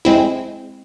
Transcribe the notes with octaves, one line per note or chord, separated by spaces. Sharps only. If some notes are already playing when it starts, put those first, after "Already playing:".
G#3 C4 E4